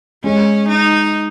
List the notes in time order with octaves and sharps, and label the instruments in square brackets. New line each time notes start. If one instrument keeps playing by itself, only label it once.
[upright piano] G#3 [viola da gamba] C#4
[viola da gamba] D#4